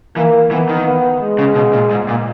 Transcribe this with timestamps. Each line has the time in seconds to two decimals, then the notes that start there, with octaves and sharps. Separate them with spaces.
0.17 E3 A#3
0.51 E3 B3
0.69 D#3
0.86 B3
1.21 G#3
1.39 C#3
1.56 B2
1.73 A#2
1.91 G#2
2.09 A#2